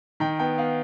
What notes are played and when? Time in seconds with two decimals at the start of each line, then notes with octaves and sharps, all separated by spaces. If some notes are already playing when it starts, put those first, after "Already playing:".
0.20 D#3 G5
0.39 B3 G5
0.58 B3 F5